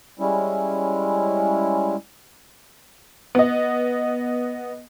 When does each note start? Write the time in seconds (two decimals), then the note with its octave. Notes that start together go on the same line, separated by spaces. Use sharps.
0.19 G3 G#3 C#4 E4
3.35 B3 D#5